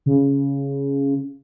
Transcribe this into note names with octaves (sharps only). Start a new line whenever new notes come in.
C#3